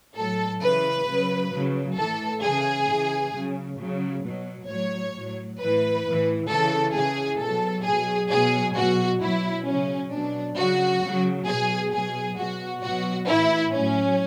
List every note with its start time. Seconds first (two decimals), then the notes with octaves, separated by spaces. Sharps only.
0.16 A2 F#3 A4
0.61 C#3 E3 B4
1.08 C#3 F#3
1.52 C#3 F#3
1.97 A2 E3 A4
2.43 C#3 E3 G#4
2.88 C#3 E3
3.33 C#3 F#3
3.78 C#3 F#3
4.24 B2 F#3
4.68 A2 F#3 C#5
5.14 A2 F#3
5.59 A2 E3 B4
6.05 A2 E3
6.49 C#3 E3 A4
6.94 C#3 E3 G#4
7.40 B2 F#3 A4
7.85 B2 F#3 G#4
8.30 B2 F#3 G#4
8.75 B2 F#3 F#4
9.20 B2 F#3 E4
9.66 C#3 F#3 C#4
10.11 B2 F#3 D4
10.57 C#3 F#3 F#4
11.01 C#3 F#3
11.47 B2 F#3 G#4
11.92 B2 F#3 G#4
12.37 B2 F#3 F#4
12.82 B2 F#3 F#4
13.27 A2 E3 E4
13.73 A2 F#3 C#4